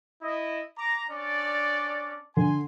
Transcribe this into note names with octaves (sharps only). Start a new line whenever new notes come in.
E4 D#5
A#5 D6
C#4 D4 D5
D3 G#5 C6